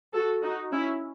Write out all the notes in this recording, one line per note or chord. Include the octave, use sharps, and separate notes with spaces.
F#4 A4
D#4 F#4
C#4 E4